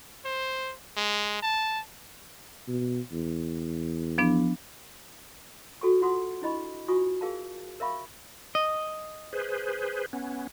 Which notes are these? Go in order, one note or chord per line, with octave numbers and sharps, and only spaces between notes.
C5
G#3
A5
B2
E2
F3 B3 D4
F#4 A4 G5 C#6
F4 F#5 C6 D#6
D4 E4 D#5 B5 C#6
F4 F#4 G#5 C#6 D#6
G#4 A#4 F5 A5
A#4 E5 F5 B5 C#6
D#5
G#4 B4 C5
B3 C#4